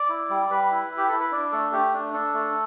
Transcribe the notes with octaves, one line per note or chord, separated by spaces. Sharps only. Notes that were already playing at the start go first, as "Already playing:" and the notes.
Already playing: D5
E4
G3
G3 B4
E4
E4
G4
E4 A4
B4
D4 D5
A3 A4
A3 G4
D4
D4 A4
A3